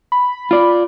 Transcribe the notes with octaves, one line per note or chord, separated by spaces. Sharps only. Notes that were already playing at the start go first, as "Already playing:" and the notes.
B5
F4 D5